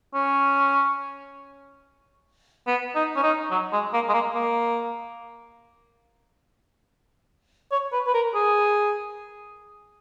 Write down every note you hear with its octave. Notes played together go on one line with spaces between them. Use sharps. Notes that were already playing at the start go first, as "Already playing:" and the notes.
C#4
B3
D#4
C#4
D#4
F#3
G#3
A#3
G#3
A#3
A#3
C#5
B4
B4
A#4
G#4